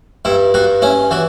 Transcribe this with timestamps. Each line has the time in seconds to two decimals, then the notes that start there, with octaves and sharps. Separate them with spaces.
0.25 G2 E4
0.54 G2 F#4
0.82 C#4 E4
1.11 E3 F#4